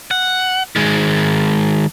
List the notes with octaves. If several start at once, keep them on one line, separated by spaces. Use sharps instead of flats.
F#5
D#3 G#3